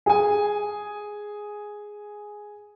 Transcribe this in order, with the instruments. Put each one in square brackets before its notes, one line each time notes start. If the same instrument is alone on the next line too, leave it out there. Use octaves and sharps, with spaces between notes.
[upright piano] G#4 G#5